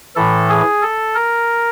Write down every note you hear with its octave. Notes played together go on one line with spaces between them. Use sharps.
A2 E3 A4
G#4
A4
A#4